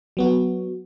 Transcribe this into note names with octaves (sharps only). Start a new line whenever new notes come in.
F#3 B3 F#4